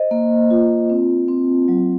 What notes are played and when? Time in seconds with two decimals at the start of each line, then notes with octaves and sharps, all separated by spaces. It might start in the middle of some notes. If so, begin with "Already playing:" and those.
Already playing: C5 D#5
0.11 A#3
0.51 F4
0.90 C4
1.28 C4
1.68 F#3